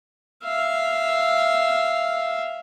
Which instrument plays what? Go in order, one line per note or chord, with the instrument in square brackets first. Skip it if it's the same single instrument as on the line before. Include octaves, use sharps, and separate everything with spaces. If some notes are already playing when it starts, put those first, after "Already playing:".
[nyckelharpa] E5 F5